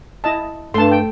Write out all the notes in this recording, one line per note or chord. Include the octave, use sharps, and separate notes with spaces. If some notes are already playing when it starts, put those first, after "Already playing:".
E4 D#5 A5
G2 A3 A5 C6
G5